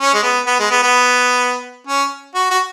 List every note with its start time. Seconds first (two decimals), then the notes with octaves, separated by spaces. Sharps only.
0.01 C#4
0.14 G#3
0.23 B3
0.46 B3
0.59 G#3
0.71 B3
0.82 B3
1.87 C#4
2.35 F#4
2.51 F#4